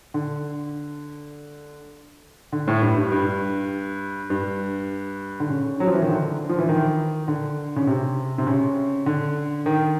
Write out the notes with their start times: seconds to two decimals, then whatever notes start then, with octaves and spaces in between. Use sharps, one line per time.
0.14 D3
2.52 D3
2.68 A2
2.82 G2
2.97 G2
3.12 G2
4.30 G2
5.40 D3
5.49 C#3
5.80 F#3
5.87 F3
5.94 E3
6.02 D#3
6.09 D3
6.49 F3
6.59 E3
6.69 D#3
7.28 D3
7.76 C#3
7.87 C3
8.38 C3
8.47 C#3
9.06 D3
9.66 D#3